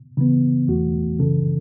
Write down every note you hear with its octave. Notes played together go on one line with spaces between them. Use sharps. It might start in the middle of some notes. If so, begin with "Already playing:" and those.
C#3 E3 B3
E2 E3 A3 F#4
F#2 C#3 E3 C#4 A4